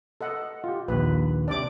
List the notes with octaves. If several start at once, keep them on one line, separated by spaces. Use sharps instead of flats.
A4 D#5 F#5
F4 G4
A#1 D#2 B4
C3 C4 D4 D5 D6